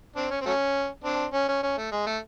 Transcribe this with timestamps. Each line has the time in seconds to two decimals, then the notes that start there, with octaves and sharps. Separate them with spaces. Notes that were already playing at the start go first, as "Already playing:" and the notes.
0.16 C4 D4
0.31 C#4
0.41 C4
0.46 F#3 A3 C#4
1.04 C4 D4
1.33 C#4
1.48 C#4
1.63 C#4
1.78 A3
1.92 G#3
2.07 A3